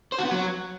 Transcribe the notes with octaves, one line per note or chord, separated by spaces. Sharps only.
C5
F#4
B3
F#3